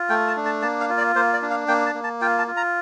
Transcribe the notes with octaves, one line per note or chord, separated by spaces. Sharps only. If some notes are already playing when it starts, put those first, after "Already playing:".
Already playing: F4
A3 G5
A5
D4
A5
A#3 A5
F5
F4
D5
A#3 C5
D5
D4
F5
A#3 G5
A5
A#3
A5
F4 G5
A5
F4
A#5